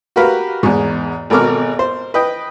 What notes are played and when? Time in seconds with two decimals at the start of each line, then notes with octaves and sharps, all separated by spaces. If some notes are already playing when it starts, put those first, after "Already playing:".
0.16 F#4 G4 A#4 B4 F5
0.63 E2 G#2
1.30 G#1 B2 A4 A#4 D6 F6
1.79 C5
2.14 B4 D#5 G5